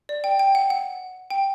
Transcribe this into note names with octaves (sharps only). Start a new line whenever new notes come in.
D5
G5
G5
F#5
F#5
G5